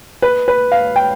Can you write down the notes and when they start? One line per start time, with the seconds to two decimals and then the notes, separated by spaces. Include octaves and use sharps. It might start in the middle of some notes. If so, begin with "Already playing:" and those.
0.22 B4
0.48 B4
0.72 F5
0.96 G5